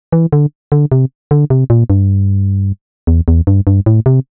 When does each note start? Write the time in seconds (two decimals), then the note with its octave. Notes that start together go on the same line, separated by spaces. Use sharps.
0.13 E3
0.33 D3
0.72 D3
0.92 C3
1.31 D3
1.50 C3
1.70 A#2
1.90 G2
3.07 E2
3.28 E2
3.47 G2
3.67 G2
3.86 A2
4.06 C3